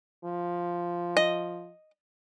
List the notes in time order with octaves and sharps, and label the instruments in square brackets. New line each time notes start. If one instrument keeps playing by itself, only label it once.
[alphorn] F3
[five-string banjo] D#5